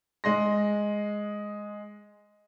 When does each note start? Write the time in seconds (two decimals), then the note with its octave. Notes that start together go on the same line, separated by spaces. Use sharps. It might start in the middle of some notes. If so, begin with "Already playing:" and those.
0.24 G#3 C6 A#6